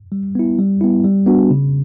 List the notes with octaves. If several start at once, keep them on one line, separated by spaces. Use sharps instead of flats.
G3
B3 E4
G3
B3 E4
G3
B3 D4 F#4
C#3